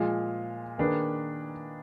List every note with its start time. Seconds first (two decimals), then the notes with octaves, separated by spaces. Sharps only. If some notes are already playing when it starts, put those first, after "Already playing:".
Already playing: A#2 F3 G#3
0.78 D#3 A#3 D4 G#4 B4